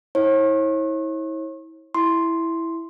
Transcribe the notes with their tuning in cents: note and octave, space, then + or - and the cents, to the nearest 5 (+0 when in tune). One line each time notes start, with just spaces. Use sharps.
E4 -35 C#5 -40
E4 +0 C6 +0